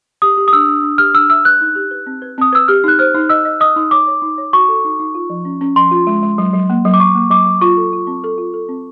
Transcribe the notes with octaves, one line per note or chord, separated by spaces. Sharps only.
G4 D#6
G4
D#6
D4 E6
D4
D4
G4 F6
D4 E6
E5 E6
B4 F#6
D#4
G4
B4
C4
B4
C4 D#6
B4 E6
G4 F6
D#4 F#6
C5 F6
D#4
D#5 E6
D#5
D#5 D#6
D#4
C#5 D6
C#5
D#4
C#5
F#4 C#6
A4
D#4
D#4
F4
F3
C#4
C#4
F3 C6
F4
G#3
G#3
F#3
F#3
A#3
F#3
D6
F#3 C#6
A#3
F#3 D6
F#3
F4 C#6
A4
F4
C4
A4
F4
A4
C4